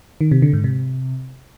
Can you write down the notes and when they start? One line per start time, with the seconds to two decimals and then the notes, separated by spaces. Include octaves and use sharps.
0.21 D#3
0.31 C3
0.42 D3
0.53 G#2
0.64 C3